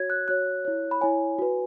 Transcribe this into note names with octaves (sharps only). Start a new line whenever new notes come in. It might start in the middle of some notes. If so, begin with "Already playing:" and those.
Already playing: F#4 C#5 G#6
F#6
F#4 C#5 F#6
E4 C#5
B5
E4 C#5 G#5
F#4 B4